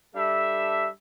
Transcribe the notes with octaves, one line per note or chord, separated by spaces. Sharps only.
G3 D4 A4 E5